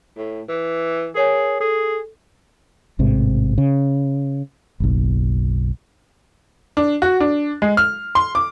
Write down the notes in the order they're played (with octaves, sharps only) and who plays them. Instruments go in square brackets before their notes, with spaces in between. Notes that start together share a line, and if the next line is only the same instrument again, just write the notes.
[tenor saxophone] A2
E3
[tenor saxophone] G#4 [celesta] A#4 C#5 G#5
[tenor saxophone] G#4 [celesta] A4
[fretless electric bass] A1 G#2 C3
C#3
F#1 B1
[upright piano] D4
F#4
D4
G#3
F6
C6
D6